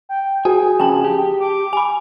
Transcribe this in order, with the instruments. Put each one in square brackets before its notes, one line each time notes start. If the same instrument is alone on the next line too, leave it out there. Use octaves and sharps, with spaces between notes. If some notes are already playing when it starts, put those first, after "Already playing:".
[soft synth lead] G5
[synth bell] F#4 [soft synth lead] G#4 [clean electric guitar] G#5
[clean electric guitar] F2 C#3 [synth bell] G5 A5
[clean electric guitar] G4
[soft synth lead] D6
[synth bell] G#5 B5